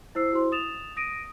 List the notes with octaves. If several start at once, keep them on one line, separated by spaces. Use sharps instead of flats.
E4 C5 E6 C7
E4 F#4 C5 C6
D#6 A6 E7 F7
D#6 A#6 D7 D#7